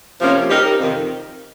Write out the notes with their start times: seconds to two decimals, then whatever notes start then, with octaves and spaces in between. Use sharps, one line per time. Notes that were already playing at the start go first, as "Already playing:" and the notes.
0.21 C3 F3 A#3 C#4
0.49 G3 C4 D#4 G4 A#4
0.79 F2 C3 D#3